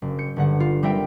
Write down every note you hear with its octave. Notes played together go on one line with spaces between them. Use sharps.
F#1
G6 C#7
G1 D3 F#5
F4
G3 C4 A#4 E5 G5